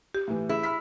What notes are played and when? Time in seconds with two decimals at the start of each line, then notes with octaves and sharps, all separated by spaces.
0.14 G4
0.28 A2 E3
0.49 E4 G#4
0.63 B5 F6 B6